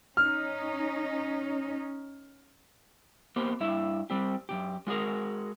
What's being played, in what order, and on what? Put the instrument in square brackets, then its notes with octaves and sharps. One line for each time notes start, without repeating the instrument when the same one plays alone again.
[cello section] C#4 D#4 [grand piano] F6
[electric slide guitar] A#3 B3 G4 C5
G2 E4 E5
G3 C4 G4
F#2 B2 G4
G#3 F4 F#4 G#4 A#4